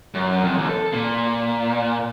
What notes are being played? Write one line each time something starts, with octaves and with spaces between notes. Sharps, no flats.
F#2
F2
D#2
A4
A#2